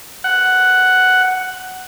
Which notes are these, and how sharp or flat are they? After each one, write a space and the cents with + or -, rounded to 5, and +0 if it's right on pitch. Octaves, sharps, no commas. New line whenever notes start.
F#5 +5